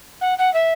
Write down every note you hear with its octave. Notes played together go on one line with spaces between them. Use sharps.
F#5
F#5
E5